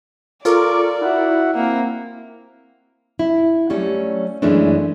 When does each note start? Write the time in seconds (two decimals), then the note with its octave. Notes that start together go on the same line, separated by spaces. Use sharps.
0.45 F4 A4 A#4 D5 C#6 D6
1.01 E4 F#4 E5 F#5
1.55 A#3 C4 E4
3.19 E4
3.70 F#3 G3 A3 C#4
4.42 F#2 E3 G#3 A3 C#4 D4